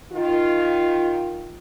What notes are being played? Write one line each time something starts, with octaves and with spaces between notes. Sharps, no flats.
D#3 F4